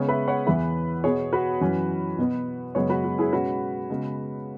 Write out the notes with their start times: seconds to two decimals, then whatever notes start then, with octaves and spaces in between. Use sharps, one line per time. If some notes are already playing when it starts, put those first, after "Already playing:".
Already playing: C#3 G#3 B3 G#4 C#5
0.08 B4 E5
0.28 C#5 F#5
0.47 E2 E3 B3 B4 E5
1.04 B2 B3 G#4 C#5
1.33 F#4 B4
1.61 F#2 E3 C#4
2.18 B2 B3
2.75 F#2 C#3 G#3 B3 G#4 C#5
2.89 F#4 B4
3.04 F#4
3.18 E4 G#4
3.33 B2 G#3 C#4 F#4 B4
3.90 C#3 G#3 B3